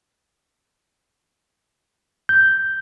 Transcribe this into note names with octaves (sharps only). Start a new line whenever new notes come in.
G6